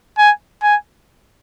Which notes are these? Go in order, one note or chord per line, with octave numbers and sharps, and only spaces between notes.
G#5
G#5